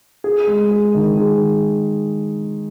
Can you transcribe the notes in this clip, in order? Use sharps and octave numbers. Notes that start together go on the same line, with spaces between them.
G#4
G#3
G#4
D#3
G#4